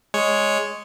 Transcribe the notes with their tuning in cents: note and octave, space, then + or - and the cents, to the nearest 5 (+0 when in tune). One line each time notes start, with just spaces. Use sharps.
G#3 +0 C#5 +0